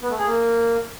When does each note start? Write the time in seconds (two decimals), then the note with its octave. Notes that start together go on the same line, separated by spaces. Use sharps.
0.01 B3
0.10 A3
0.18 G#4
0.26 A#3